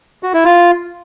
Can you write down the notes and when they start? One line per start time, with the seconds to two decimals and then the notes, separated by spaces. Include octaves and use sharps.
0.23 F#4
0.34 E4
0.45 F4